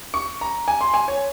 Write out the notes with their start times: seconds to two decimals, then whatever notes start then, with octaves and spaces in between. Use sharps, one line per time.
0.14 C#6
0.41 A#5
0.68 G#5
0.81 C6
0.94 G#5
1.08 C#5